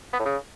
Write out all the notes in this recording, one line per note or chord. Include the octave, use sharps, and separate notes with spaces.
B3
A2
C#3